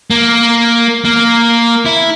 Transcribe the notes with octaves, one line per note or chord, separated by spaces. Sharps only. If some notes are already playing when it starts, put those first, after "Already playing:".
A#3
A#3
E4